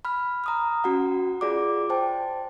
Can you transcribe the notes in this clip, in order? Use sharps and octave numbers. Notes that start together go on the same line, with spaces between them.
B5 F6
A#5 D#6 F6
C#4 F#4 F#5
F4 G#4 D5 F#5 D6
C5 G5 A5